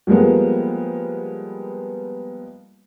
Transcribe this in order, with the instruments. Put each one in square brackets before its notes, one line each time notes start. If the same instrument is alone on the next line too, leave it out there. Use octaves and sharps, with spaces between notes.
[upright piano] F3 G3 G#3 A#3 B3